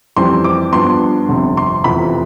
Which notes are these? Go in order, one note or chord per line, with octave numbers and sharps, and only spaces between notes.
F2 E3 G3 C4 C6
D6
G2 F3 B3 C6
G1 F2 C3
C6
F1 E2 C3 F3 B5